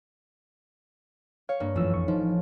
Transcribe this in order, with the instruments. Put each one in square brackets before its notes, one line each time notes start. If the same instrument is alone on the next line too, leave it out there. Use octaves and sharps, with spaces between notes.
[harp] C#5 [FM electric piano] F5
[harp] G2 A#3
[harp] A1 [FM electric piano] F#2 F3 E6
[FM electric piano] F2 C#6
[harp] F3 [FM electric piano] D#4